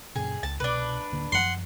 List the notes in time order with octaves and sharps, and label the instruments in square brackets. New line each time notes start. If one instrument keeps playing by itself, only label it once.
[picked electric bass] F#2 A#2 C#3 [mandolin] G#4
[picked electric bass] C#2 [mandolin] A5
[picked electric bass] C2 B2 [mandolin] D4 B4
[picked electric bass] D1 D3 A#3
[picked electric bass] F#2 F3 [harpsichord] F#5 C6